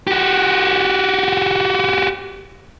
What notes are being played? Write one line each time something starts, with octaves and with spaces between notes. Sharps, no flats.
F#4 G4